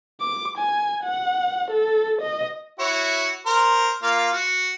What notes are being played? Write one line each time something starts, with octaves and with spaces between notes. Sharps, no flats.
D6
G#5
F#5
A4
D#5
E4 F#4 C#5
A#4 C5
A#3 F4 F5
F#4